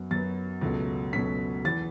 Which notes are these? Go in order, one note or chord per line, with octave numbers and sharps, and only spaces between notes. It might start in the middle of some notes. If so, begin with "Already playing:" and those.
Already playing: F#2 F#3 B3
F#2 F#3 B3 A6
C#2 B2 F#3 A3 C#4
C#2 B2 F#3 A3 C#4 B6
E2 E3 B3 A6